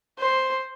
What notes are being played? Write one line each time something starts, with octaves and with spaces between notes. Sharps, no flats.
C5